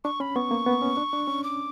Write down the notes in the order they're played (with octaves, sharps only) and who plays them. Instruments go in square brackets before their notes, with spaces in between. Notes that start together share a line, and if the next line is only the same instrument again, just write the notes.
[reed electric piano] D4 [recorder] C#6
[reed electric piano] C#4 [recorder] B5
[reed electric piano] B3 [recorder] C#6
[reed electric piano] A#3
B3
C#4
D4
D4
C#4
[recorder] D6